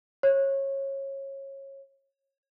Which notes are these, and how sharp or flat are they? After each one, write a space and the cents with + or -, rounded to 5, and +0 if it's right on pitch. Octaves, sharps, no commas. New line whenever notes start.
C#5 -25